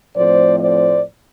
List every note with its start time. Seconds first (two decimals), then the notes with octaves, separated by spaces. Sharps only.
0.16 A2 F3 A3 C4 C5 D5
0.60 C5 D5